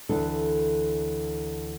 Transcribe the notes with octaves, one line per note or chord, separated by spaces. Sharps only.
D2 E3 D4 A4